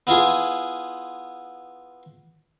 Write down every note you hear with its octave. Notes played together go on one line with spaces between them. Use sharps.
B3 E4 F4 G#4